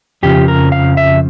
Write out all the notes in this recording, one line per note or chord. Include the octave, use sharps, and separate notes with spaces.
F2 C#3 F3 G4
A#4
F5
E5